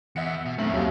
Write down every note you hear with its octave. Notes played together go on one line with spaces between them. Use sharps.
E2 E5 F#5 C#7
B2
B1 F#2 A3 C4 F#7
D#2 F#3